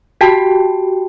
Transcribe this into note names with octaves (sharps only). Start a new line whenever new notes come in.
F#4 G4 G5 A5